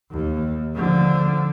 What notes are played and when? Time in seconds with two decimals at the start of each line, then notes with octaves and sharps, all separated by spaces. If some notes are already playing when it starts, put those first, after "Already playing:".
0.11 D#2
0.75 D3 F3